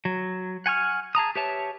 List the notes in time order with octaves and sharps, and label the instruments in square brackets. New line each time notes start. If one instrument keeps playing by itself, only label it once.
[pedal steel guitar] F#3
F#5 G#5 C#6 F6
G#4 A5 A#5 D#6
G4 B4 C#5 E5 A5